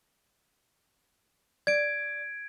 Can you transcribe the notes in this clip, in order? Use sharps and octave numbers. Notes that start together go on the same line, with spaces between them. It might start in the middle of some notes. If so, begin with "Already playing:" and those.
D5 G#6 D7